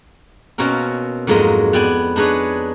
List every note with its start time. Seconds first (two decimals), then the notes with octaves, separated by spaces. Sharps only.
0.58 B2 A#3 C4 C#4 A#4
1.27 F2 G#2 F#3 A#3 D#5
1.73 B3 D5 G5 G#5
2.16 D4 D#4 G#4 B4 C#5